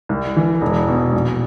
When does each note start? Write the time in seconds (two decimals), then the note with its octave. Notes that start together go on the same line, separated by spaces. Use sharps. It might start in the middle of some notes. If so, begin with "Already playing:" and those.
0.09 C2
0.36 E3
0.61 E1
0.88 B2
1.13 A#1